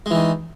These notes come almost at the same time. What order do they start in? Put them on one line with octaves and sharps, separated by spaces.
G#3 E3 D#3